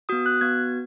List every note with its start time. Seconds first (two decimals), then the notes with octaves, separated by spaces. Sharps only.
0.09 B3 F#4 D#6
0.26 F#6
0.41 B3 F#4 G#6